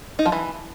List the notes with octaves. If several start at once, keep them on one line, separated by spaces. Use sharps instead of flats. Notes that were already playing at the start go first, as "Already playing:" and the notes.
D#4
F3
E3